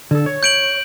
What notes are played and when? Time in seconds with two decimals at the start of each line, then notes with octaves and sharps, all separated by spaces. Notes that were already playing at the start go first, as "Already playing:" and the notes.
0.11 D3 A4
0.26 C#5
0.43 G6 D7 F#7